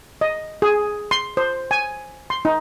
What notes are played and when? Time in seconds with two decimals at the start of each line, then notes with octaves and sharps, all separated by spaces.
0.21 D#5
0.62 G#4
1.11 C6
1.37 C5
1.71 G#5
2.30 C6
2.45 D#4